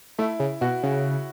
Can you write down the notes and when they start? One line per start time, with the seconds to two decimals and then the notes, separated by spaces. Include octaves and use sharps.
0.19 A3 E4
0.40 C#3
0.61 B2 F#4
0.83 C#3